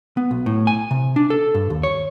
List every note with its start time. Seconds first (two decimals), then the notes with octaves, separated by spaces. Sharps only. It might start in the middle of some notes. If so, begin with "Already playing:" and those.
0.17 B3
0.31 B1
0.46 A2
0.67 G#5
0.91 C3
1.16 D4
1.30 A4
1.54 G2
1.70 D#2
1.83 C#5